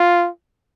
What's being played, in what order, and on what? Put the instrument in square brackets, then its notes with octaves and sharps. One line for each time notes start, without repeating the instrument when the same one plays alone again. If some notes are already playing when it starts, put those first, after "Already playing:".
Already playing: [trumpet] F4